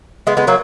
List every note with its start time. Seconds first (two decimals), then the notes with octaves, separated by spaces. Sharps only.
0.27 G#3 B3
0.37 G#3 B3
0.47 F#3 A#3